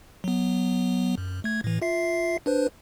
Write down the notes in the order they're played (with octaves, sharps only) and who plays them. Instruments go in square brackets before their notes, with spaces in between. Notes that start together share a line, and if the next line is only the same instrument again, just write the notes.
[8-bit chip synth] F#3 B3
F#2
A3 G#6
A2 E3
F4 E5 C7
D4 B4 C5